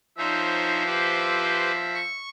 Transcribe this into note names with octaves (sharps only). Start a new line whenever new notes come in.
F3 D#4 C5 C#5 E5
G4 B4 C5
C#6